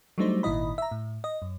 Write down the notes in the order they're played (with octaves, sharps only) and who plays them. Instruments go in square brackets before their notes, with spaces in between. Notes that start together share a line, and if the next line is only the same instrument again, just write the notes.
[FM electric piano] F#3 G3 A3 D4 D#4 C5
G#1 A#2 D#3 E4 D#5 B5
E5 A#5
A2
D#5
F#2